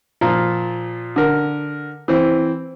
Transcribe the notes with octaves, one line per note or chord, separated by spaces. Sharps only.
A#2 F3 F4
D3 A#4
E3 C4